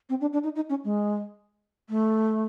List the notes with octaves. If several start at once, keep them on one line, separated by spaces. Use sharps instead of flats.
C4
D4
D4
D#4
D#4
C#4
G#3
A3